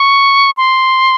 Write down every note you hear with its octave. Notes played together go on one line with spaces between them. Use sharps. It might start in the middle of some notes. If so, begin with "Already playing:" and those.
Already playing: C#6
C6